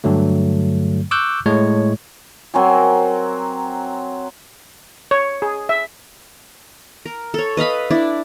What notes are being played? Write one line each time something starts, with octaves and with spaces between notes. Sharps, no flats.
G2 D3 F#3 A3
C#6 D6 E6 F#6 G6
A2 G#3 C#5
F#3 C4 A#4 G#5
C#5
G#4
E5
A#4
A4 C#5
B4 D#5 F5 B5
D4 E4 D5